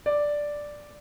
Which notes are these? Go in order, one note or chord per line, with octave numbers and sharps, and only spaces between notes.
D5